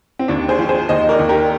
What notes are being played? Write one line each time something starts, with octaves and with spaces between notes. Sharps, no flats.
C4
D#2 D4
G#4 C5
F3
G#4 C5
D#2 C5 D#5
A#4 D5
D#2
G4 A#4